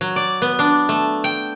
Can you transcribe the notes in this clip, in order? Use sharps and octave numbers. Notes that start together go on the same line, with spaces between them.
F#3
D5
B3
D4
A3
G5